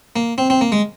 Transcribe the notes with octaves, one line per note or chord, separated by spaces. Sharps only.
A#3
C4
C4
A#3
G#3